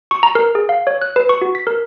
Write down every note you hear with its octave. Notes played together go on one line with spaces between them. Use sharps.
C#6
A#5
A#4
G#4
F5
C#5
F#6
B4
C#6
F#4
B6
A#4